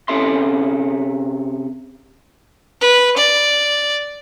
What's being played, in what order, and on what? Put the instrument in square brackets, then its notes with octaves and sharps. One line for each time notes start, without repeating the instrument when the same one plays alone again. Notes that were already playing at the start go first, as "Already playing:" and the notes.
[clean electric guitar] C3 A#3 C#4 A4 E5 C6
[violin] B4
D5